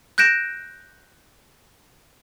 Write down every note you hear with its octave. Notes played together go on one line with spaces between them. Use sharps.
F#6 G6 A#6 D7 E7